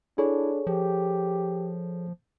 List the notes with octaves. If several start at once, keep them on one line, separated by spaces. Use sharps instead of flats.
D4 E4 G#4 A4 C#5
F3 G4